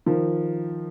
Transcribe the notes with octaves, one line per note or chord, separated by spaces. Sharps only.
D#3 F3